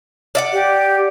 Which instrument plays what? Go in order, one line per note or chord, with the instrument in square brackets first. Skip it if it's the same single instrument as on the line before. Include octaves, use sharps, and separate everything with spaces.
[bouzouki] D5 E5 F#5
[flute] G4